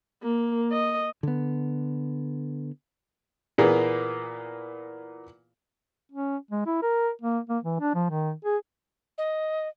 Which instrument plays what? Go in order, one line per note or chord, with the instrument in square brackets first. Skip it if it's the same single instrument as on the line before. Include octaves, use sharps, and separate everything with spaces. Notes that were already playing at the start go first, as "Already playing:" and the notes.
[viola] A#3
D#5
[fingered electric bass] D3 B3
[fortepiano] A#2 E3 A#3 B3 G#4
[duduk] C#4
G#3
E4
A#4
A#3
A#3
E3
D4
F3
D#3
G#4
[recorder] D#5